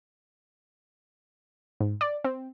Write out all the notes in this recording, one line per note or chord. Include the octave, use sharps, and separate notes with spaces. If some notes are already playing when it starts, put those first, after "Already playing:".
G#2
D5
C4